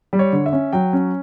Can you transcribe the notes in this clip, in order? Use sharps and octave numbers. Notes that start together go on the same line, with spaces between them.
G3
C#5
D3
E5
C#4
F#3 G5
C#4